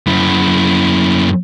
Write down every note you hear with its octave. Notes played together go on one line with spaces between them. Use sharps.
F#2 E4